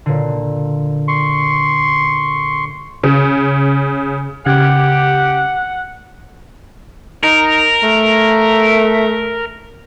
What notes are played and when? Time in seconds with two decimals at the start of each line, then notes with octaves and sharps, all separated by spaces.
0.06 A#2 D3
1.08 C6 C#6
3.03 C#3
4.46 C#3 G4 F#5
7.24 D#4 A#4
7.83 A3